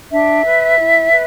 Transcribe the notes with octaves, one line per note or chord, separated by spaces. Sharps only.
D4 E5
B4
E4
B4